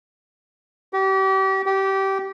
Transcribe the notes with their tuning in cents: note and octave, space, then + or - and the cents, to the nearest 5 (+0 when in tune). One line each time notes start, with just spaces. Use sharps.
G4 -35
G4 -20